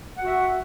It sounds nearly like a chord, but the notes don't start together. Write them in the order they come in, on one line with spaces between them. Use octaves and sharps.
F#5 F#4 E5